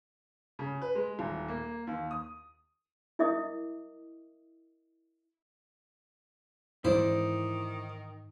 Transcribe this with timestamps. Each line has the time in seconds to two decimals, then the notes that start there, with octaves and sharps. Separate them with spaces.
0.59 C#3
0.82 B4
0.95 G#3
1.19 D#1
1.48 A#3
1.87 D#2
2.11 D#6
3.19 E4 A#4 D#5 E5 D6 D#6
6.85 G#2 D#3 E3 G#3 E4 C5 D5